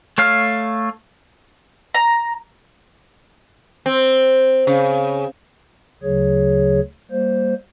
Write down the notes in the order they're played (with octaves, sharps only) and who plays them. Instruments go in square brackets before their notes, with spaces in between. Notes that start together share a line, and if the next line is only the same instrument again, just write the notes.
[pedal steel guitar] A3 C#5 F5 F6
[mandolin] A#5
[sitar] C4
C#3
[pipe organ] D2 C#3 F#3 G#4 C#5
G3 A#3 C5